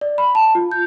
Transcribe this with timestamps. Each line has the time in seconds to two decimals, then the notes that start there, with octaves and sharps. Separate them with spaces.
0.01 D5
0.18 B5
0.35 A5
0.55 F4
0.72 G6